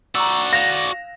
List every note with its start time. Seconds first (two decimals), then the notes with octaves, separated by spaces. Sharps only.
0.15 F#4 D5 A#5 C#6 E6
0.53 F5 A#6 E7 F7